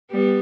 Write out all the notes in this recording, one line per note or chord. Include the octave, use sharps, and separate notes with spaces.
G3 B3